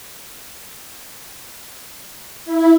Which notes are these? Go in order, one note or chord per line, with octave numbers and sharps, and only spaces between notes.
E4